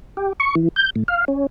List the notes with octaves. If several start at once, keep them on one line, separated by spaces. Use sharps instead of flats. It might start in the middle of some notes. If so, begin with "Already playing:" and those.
G4
C#6
E3
G6
A2
F5
C#4